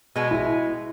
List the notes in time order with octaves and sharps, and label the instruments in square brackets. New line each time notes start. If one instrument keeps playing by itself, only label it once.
[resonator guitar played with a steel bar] B2 G#3 B3
[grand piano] E4